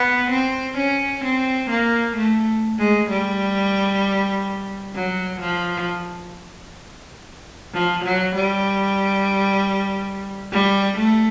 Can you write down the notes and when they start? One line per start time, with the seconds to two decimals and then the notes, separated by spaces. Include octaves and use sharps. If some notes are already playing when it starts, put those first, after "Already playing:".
Already playing: B3
0.30 C4
0.77 C#4
1.24 C4
1.70 A#3
2.16 A3
2.78 G#3
3.10 G3
4.95 F#3
5.40 F3
7.73 F3
8.04 F#3
8.35 G3
10.52 G3
10.97 A3